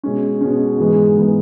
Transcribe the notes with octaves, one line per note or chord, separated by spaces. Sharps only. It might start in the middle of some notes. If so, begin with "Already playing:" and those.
B2 G#3 C#4
B2 G#3 C#4
G#2 E3 G#3 B3
G#2 E3 G#3 B3